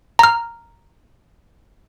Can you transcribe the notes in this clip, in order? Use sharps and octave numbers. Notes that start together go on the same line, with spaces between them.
A#5 F6